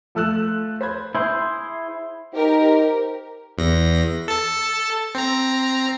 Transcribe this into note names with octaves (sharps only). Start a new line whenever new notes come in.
F3 A3 E6 F#6 E7
C5 B5 G#6
E4 G#4 C5
D#4 G4 A#4 C5
E2 A#6
A4 A5
C4 A#5